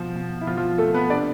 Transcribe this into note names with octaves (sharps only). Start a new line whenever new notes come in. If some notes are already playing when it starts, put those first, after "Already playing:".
Already playing: B2 F3 F4
B2
E4
B2 F3 F4
F3 F4
B2 A3 A4
B3 B4
C3 D4 D5